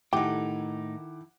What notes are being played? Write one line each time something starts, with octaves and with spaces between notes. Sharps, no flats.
A2 D#3 D#4 E4 G4 A4 F#5 D6